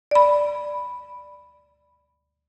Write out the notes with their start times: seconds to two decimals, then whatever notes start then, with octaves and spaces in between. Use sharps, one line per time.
0.11 D5 B5